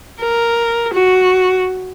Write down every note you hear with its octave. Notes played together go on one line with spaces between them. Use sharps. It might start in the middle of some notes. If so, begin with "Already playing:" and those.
A#4
F#4